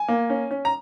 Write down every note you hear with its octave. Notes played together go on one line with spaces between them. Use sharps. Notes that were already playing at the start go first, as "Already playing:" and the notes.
Already playing: G#5
A#3
C#4
C#4
A#5